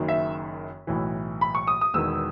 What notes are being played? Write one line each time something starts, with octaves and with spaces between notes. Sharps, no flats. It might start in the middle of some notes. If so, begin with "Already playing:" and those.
Already playing: F#1 F#2 D#3
E5
B1 A2 E3
B5
C#6
D#6
D#6
E1 E2 D#3 E6